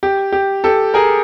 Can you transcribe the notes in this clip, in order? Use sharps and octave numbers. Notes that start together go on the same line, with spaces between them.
G4
G4
G4 A4
G#4 A#4